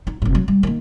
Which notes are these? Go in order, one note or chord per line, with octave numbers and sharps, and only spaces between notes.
D#4
F1 A2
F#3
G3
D#3 A#3